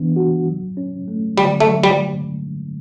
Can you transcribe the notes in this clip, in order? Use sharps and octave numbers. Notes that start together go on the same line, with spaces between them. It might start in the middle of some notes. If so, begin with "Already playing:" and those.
Already playing: E3 B3 D4
F#4
F#3
C#4
A3
D3 G3
A3
F#3
G3